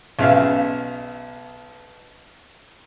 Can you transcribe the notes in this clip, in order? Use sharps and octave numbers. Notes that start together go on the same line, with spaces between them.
B1 C#3 E5 F5